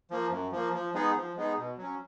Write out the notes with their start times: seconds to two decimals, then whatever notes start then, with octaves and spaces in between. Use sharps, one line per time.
0.11 F3 A#3
0.31 F#2
0.52 F3 A#3
0.74 F3
0.94 G#3 B3 D#4 G#4
1.16 F3
1.36 G#3 B3 D#4 G#4
1.57 B2
1.78 F#3 C#4